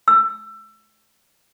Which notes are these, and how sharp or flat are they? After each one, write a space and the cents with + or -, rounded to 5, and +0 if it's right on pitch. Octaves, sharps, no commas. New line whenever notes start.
E6 +20